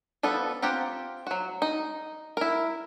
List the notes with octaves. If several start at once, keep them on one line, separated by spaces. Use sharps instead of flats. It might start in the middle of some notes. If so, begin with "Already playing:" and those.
F3 G3 B3 A4
C4 F4 G4 F#5 A#5
F#3 F#4
D#4
E4 A#4